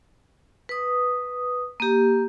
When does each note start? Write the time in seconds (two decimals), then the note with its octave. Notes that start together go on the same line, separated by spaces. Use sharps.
0.69 B4 D#6
1.80 A#3 G4